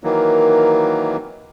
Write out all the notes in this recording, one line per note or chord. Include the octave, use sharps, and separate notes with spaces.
D#3 E3 F#3 A#3